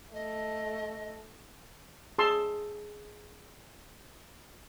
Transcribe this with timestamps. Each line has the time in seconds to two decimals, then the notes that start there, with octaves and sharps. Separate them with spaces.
0.14 A3 D#5
2.18 G#4 A5 C6 E6